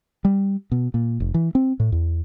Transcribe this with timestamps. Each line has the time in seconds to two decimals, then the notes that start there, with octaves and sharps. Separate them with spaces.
0.25 G3
0.72 B2
0.94 A#2
1.20 F1
1.34 E3
1.55 C4
1.80 A2
1.92 E2